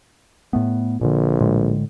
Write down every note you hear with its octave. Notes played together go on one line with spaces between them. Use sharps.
A2 A3 B3
A#1 A#2 D3
A2 D3 G#3